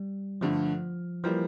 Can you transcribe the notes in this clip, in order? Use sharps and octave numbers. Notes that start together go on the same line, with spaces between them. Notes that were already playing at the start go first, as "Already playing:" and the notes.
Already playing: G3
G2 D3 F3 A3
E3 F3 G3 A#3